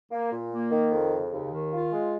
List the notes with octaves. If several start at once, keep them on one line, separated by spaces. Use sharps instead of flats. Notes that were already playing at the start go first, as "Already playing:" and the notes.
A#3
A#2
A#3
D#3
F2
C#3
D#2
D#3
F4
G#3